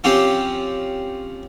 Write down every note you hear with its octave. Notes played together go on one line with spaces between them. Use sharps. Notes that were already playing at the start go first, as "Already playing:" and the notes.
F3 C4 C#4 F4 G4